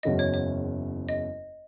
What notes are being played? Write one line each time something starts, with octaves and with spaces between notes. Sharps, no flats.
F#1 E2 C#3 F#3 C#4 D#5
C#5
C#5
D#5